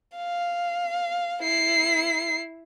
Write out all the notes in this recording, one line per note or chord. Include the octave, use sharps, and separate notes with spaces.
F5
E4 C7